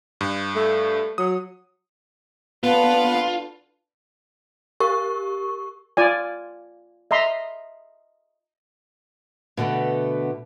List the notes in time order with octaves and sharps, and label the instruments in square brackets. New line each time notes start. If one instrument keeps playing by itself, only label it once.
[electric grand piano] G2
[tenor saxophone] A3
[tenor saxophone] F#3 [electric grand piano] D#6
[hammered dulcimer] D3 [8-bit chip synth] B3 [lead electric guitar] F4 [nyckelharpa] B4
[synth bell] G4 A#4 C#6
[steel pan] F4 D5 G#5
D#5 E5 A#5 C6
[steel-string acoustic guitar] B2 D3 A3 B3